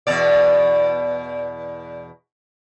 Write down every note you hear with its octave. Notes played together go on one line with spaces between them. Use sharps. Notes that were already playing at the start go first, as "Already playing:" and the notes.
E2 B2 D5